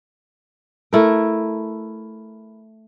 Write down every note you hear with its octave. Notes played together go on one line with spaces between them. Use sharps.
A3 E4 A#4